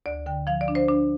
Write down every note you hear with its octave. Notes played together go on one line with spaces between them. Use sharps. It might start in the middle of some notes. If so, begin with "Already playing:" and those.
D2 D5
D3 G5
F3 F5
D5
D4
C5
D4